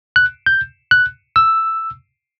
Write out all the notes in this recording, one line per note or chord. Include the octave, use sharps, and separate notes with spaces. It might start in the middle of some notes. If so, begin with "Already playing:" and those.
F#6
G6
F#6
E6